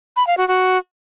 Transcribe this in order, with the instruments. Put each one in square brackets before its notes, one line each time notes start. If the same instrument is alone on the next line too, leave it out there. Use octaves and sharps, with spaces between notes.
[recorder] B5
F5
F#4
F#4